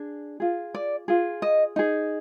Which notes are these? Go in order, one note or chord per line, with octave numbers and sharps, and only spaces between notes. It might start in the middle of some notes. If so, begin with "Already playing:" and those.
Already playing: D4 G#4
F4 G#4
D5
F4 G#4
D#5
D#4 G#4